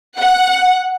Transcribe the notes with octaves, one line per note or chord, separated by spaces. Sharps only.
F#5